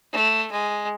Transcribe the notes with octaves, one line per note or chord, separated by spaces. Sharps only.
A3
G#3